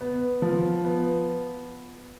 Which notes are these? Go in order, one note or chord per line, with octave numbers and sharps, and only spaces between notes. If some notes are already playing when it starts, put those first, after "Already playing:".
B3
F3
B3